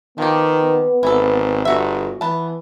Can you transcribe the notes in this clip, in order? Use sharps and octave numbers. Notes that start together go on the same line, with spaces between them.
D#3 F3 B3 G4
G#1 E3 A4
G1 F#4 E5
E3 B3 A5